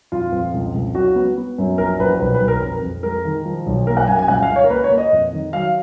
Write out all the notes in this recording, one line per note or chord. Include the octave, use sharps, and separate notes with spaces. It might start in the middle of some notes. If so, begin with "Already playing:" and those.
F2 F4
F2
C#2
C#2
F#3 F#4
B3
B3
F#2
A#1 A#4
A#1 B4
B1 B4
B4
B1
A#4
F2
F2
G#3 A#4
D#3
F3
B1
A#3 A#4
F#5
F#2 G#5
G#5
C#2 F#5
F5
C#2
C#5
A#4
A#3 B4
C#5
A#3
D#5
F2
D#3
F#3 F5